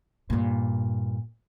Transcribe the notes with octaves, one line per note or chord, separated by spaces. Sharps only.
G2 A#2